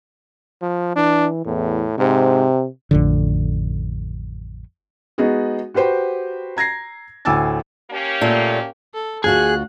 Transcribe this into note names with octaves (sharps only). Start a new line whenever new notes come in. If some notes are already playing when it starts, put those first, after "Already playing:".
F3
E3 D4
E2 A2
G#2 C3
A1 F2 D3
G#3 B3 D#4 F#4 G#4
F#4 G4 B4 C5 G5
A#5 G#6 A#6 C7
D2 A2 G#5 D6 E6 A6
A#3 C#4 G4
A#2 A3
A4
D2 F4 F#4 G#4 F#6